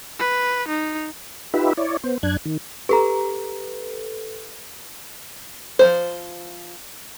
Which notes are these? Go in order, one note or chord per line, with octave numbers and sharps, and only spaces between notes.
B4
D#4
D#4 F4 G4 B4 E5
E4 C#5 D5
B3 C5
F#2 D4 F#6 G#6
D#3
G4 A4 B4 A#5
F3 A3 C5